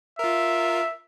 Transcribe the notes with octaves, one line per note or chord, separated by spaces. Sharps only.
F4 A#4 E5